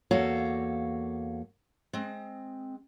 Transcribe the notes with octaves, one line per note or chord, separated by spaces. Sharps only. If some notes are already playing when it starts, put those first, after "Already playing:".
E2 A#3 F#4 A4 C#5 F5
G#3 C4